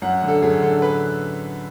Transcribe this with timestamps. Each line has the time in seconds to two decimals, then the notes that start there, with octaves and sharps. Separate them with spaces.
0.02 F#2 F#5
0.22 D3
0.28 A4
0.42 F#2 G#4
0.62 D3 A4
0.82 B4